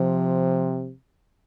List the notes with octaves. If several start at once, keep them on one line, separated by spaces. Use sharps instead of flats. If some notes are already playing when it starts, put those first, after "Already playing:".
Already playing: C3 F3